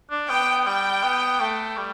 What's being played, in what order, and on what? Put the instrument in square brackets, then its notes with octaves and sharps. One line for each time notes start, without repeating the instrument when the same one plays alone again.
[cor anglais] D4
[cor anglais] B3 [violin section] G5
[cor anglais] G3 [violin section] G5
[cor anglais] B3
A3
G3